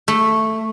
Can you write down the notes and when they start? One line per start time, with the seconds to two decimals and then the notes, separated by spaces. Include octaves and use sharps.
0.08 A3